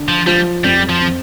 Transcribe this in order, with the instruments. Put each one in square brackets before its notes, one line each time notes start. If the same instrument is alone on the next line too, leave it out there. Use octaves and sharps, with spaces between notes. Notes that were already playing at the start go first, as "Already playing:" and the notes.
Already playing: [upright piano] D3
[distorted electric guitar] F3
[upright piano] F3 [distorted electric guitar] G3
[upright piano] F2 [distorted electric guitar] G3
[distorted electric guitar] F3
[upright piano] C4